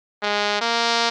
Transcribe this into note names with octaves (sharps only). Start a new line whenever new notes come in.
G#3
A#3